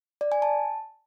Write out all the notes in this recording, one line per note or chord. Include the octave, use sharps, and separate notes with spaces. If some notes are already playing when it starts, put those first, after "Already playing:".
D5
G#5
A5